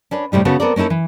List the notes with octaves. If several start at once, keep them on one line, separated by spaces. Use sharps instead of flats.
C#4 D4 B4
A2 C3 G3 D#4
C#3 B3 F#4 A4
B3 C4 A4 A#4 D5
A#3 C#4 D#4 E4 A4
E3